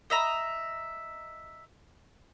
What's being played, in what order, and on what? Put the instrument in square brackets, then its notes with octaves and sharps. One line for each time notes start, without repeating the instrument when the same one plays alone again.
[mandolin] D#5 E5 A#5